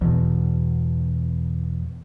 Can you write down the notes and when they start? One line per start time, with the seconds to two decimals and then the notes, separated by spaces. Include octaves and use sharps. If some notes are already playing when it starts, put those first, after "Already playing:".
0.02 E2 B2